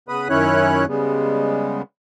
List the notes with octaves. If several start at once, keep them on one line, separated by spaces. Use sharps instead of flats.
C#3 B3 B4 B5 D#6
F#2 D#3 C#4 E4 C#5 F#6
C#3 G3 G#3 B3